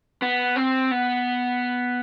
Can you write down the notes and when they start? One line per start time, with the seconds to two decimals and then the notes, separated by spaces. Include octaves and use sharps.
0.22 B3
0.56 C4
0.91 B3